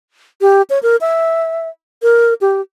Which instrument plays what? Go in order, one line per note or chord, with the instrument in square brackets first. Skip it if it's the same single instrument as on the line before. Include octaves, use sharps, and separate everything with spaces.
[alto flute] G4
C#5
A#4
E5
A#4
G4